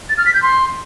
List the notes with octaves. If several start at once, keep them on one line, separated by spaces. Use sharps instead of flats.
A6
F6
B6
G6
C6